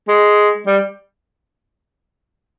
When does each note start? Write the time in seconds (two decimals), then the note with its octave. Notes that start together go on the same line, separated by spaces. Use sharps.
0.08 G#3
0.67 G3